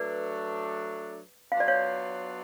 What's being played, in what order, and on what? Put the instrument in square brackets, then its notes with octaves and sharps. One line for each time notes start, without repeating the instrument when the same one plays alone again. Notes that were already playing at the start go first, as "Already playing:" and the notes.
Already playing: [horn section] F#3 A3 D4 [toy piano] B4 D5
[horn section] F#3 B3 D4 F4 [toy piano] F5
[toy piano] D5
C#5 F5